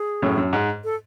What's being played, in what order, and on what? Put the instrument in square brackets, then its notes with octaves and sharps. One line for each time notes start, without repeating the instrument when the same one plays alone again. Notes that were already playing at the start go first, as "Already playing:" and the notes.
Already playing: [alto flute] G#4
[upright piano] F#2 A2
F#2
G#2
[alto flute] A4